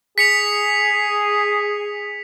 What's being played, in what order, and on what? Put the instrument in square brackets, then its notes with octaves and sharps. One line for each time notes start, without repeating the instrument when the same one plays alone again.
[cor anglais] G#4 [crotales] B6 C#7 F7